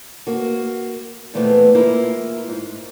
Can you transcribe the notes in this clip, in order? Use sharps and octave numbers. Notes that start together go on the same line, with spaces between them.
A#3 F#4
A#2 E3 G#3 A3 B3 C4
A#3 E4 F4 G#4
G#2